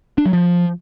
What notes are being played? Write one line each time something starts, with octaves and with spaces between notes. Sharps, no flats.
D4
F#3
F3